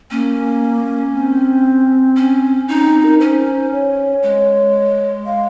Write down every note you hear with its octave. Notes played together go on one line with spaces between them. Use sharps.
A#3 C#4
C4
C#4
C#4 D#4
C4
A#4
C#4 C5
C#5
G#3
F5